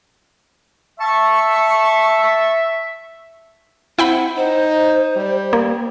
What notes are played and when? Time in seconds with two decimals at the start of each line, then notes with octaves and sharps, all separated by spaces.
1.00 E5 A5 C#6
3.99 C4 E4 F#5 G5 B5
4.36 D#4 C5
5.16 G3
5.53 A#3